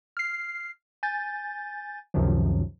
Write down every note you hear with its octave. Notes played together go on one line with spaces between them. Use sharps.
F6 C7
G#5 G6 A6
C#2 F#2 C3 D#3 F3 F#3